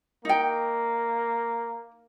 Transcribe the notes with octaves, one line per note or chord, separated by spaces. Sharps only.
A#3 D#4 G5